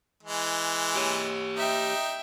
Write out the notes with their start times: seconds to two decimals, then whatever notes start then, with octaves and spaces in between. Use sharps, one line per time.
0.23 E3 G#3
0.95 G4 C#5
1.57 D#4 E5 G5